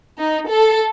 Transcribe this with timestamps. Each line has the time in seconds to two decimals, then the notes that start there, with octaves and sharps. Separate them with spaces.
0.19 D#4
0.50 A4